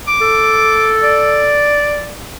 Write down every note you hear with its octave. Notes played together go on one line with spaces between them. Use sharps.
D6
A4
D5